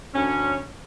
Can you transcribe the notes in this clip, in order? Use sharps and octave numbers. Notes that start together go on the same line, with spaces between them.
D2 C#4